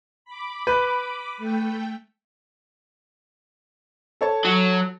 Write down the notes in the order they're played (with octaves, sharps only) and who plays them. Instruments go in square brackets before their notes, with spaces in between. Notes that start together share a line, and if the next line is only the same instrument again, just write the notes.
[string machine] B5 D6
[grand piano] B4
[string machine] A3 G5
[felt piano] A4 C#5 A5
[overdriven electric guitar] F#3